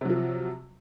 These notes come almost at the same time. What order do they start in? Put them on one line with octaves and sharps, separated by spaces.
C3 F#3 F3